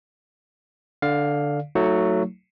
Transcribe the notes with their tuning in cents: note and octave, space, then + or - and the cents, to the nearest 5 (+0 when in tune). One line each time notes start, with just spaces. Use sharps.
D3 +0 D5 +0 F5 +10
F#3 +0 A3 +20 D#4 +30